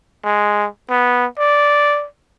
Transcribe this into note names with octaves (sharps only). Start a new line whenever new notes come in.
G#3
B3
D5